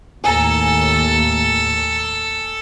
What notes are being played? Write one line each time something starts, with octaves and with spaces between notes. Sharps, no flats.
D#2 A2 A4 G#5 A#5